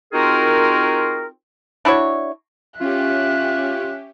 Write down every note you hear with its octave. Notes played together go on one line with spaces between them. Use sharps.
C4 D#4 F4 F#4 G#4 A#4
D4 E4 F#4 C#5
C#4 F4 G4 E5 F#6